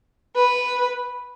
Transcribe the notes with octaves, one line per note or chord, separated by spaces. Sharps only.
B4